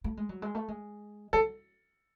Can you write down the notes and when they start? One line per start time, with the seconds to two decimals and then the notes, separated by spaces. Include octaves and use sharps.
0.04 A3
0.17 G#3
0.29 F#3
0.42 G#3
0.55 A3
0.68 G#3
1.33 F#3 A4